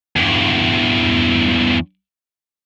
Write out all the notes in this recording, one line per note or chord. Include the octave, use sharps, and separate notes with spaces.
E2 G2